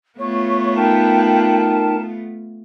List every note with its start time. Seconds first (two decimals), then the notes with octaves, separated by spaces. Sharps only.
0.18 A3 B3 F4 C#5
0.76 D#4 A#4 G5 A5